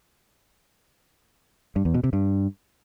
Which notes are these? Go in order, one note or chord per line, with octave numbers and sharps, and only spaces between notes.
G2
E2
B2
C3
G2